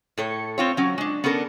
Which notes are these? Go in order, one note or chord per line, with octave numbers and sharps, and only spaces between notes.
A2 A4 C#5
C4 F4 C#5
F#3 C#4
G#3 D4
B3 C#4 D4 A4 A#4